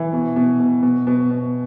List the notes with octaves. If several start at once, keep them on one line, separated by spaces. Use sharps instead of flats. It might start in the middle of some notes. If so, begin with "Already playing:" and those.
Already playing: E3
B2
B2
B2
B2
B2
B2